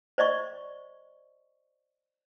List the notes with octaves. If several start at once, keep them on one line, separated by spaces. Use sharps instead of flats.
C5 D5 D#5 C#6